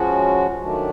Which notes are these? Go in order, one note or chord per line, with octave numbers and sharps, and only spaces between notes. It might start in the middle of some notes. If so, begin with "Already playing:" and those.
Already playing: F3 G#3 C#4 F#4
D#3 F#3 A3 D4